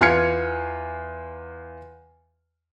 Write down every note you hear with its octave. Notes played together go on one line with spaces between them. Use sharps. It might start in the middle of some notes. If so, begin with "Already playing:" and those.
E2 F4 G#5 F6 G#6 C#7